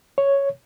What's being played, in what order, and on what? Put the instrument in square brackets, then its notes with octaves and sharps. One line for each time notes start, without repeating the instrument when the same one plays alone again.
[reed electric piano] C#5